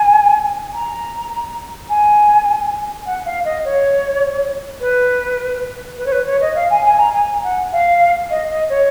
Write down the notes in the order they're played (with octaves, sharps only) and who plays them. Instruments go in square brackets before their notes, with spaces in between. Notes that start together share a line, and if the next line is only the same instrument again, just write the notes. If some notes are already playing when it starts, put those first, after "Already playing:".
Already playing: [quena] G#5
A#5
G#5
F#5
F5
D#5
C#5
B4
B4
C#5
B4
C#5
D#5
F5
G#5
G#5
A#5
G#5
F#5
F5
D#5
D#5
C#5